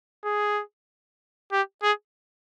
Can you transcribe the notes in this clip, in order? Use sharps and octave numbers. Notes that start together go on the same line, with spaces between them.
G#4
G4
G#4